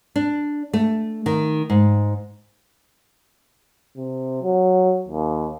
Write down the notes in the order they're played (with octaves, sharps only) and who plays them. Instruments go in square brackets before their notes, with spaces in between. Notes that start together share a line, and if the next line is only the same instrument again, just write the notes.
[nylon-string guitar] D4
A3
D#3
G#2
[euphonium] C3
F#3
D#2